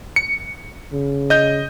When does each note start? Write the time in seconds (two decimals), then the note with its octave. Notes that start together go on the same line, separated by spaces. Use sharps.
0.16 C#7
0.93 C#3
1.30 D#5 G6